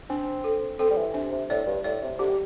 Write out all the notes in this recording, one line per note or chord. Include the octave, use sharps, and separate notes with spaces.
C4 D4
A4
C4 A4
G3
E3
C3 D4
C3
A2 D5
G2
A2 D5
C3
D3 G4
G3